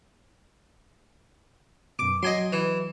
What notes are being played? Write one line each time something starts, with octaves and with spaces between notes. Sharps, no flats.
F#2 B2 D6
F#3 D#5 G#5 C6
E3